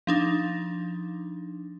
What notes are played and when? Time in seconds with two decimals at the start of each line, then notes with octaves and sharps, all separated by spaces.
0.07 F3 D4 D#4